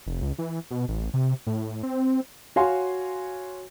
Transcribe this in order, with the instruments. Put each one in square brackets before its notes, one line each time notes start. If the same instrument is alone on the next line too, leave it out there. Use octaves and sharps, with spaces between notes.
[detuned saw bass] F1
C#2
E3
B2
A1
C3
A2
C4
[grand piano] F#4 C#5 F5 G#5 C6